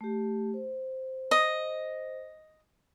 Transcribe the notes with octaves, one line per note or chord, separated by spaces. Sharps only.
A3 G4
C5
D#5